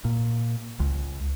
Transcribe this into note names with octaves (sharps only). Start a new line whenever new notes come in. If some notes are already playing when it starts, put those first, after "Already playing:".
A#2
C#2